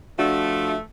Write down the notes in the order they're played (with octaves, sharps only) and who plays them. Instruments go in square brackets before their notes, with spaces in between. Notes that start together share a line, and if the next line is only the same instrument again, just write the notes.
[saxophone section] F3 A3 [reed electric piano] D4 F#4